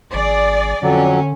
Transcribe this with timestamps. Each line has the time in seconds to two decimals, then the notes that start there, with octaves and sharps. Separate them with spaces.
0.14 G#1 G#4 D5
0.83 F2 D3 F#3 C#4